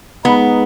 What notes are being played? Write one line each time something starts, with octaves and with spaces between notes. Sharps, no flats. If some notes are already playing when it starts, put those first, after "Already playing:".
G#3 B3 D#4 G#4